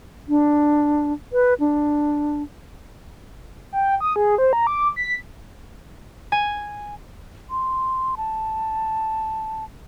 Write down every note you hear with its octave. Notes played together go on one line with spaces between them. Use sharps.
D4
B4
D4
G5
D#6
G#4
C5
A#5
D6
B6
G#5
C6
A5